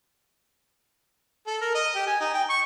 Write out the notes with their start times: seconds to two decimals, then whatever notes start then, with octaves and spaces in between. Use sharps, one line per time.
1.47 A4
1.61 A#4
1.74 D#5
1.95 G4
2.07 G#5
2.20 D#4
2.34 G5
2.50 C#6